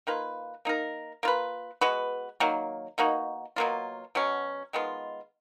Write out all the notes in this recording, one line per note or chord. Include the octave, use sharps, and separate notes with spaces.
D#3 A#3 F4 B4
A#3 D#4 A#4
A#3 F4 B4
G#3 B3 F#4 B4
D#3 F#3 A#3
B2 A#3 D#4 F#4
B2 F#3 A#3 F4
B2 F#3 C#4
D#3 G#3 B3 F4